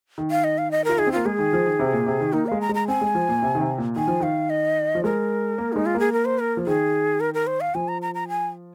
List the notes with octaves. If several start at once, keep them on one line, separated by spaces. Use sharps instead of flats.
D#3
F5
D#5
F5
D#5
F4 A#4
D#4 G#4
C4
A#3 F4
G#3 G#4
D#3
F3
D#3
C3
A#2
C3
D#3
A#3 D#4
G#3 F5
A#5
G#3
A#5
C4 G#5
G#3
F3
A#2
C3
D#3
C3
A#2
D#3 G#5
F3
D#3 F5
D#5
F3
G#3 A#4
A#3
G#3 D#4
F4
A#3
G#4
A#4
C5
A#4
F3
D#3 G#4
A#4
A#4
C5
F5
F3 G#5
A#5
A#5
A#5
G#5